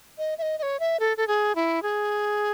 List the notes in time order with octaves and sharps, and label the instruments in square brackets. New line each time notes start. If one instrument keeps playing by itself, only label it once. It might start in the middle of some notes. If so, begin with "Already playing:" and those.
[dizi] D#5
E5
D#5
D#5
C#5
E5
A4
A4
G#4
E4
G#4